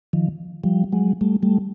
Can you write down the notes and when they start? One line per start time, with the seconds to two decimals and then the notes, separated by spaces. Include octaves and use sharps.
0.13 D#3 F3
0.64 F3 G3
0.92 F#3 G#3
1.21 G3 A3
1.43 G3 A3